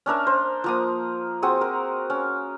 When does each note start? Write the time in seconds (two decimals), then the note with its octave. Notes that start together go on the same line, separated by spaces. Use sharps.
0.06 C#4 D4 A#4 E5
0.27 C5
0.64 F3 A#3 D#6
1.42 C4 F#4 G#4 D#6
1.61 A#4
2.10 C#4